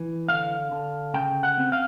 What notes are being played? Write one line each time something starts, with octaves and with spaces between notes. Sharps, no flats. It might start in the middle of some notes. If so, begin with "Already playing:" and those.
Already playing: E3
D3 F5
D3
C#3 G5
F#5
C4
F5